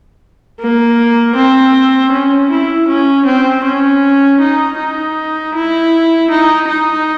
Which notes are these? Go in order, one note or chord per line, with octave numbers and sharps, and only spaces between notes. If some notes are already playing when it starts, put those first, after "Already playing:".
A#3
C4
C#4
E4
C#4
C4
C#4
D#4
D#4
E4
D#4
D#4